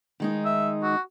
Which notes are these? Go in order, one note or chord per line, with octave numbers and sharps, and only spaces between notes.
D#3 G#3 D#4
E5
F#4